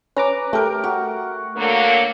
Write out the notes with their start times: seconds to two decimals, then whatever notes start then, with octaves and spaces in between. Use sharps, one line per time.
0.17 C#4 B4 A#5 D6
0.53 A3 G4 A#4
0.84 F#4
1.57 D3 F#3 A#3